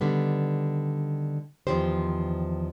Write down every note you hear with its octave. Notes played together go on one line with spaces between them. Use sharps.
D3 D#3 G3 B3
E2 D#3 F3 G4 C5